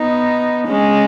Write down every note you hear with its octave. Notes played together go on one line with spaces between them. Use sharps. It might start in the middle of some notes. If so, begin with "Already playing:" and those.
Already playing: B3 D#4
G#3 C#4